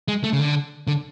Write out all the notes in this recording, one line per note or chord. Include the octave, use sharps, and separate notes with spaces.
G#3
A3
C#3
D3
D3